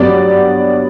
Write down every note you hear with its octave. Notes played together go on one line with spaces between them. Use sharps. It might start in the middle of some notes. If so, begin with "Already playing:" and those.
Already playing: G2 F#3 B3 D5